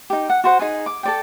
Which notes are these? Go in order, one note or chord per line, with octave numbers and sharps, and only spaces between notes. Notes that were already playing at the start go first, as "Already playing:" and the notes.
D#4 G4
F#5
F#4 C5 F#5
D#4 G#4 G#5
D6
A4 D5 G5